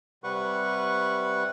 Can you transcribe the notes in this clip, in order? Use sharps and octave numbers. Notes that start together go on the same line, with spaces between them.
C3 G3 B4 F#5 C#6